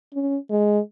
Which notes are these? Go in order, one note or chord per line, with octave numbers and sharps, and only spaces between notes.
C#4
G#3